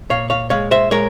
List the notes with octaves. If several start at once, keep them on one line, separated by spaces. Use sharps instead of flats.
A#2 C#5 F5
C#5 F5
G#3 C#5 F5
C5 E5
G#3 A#4 C#5